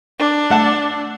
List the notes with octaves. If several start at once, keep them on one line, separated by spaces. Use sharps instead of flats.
D4
A3 F#5 A5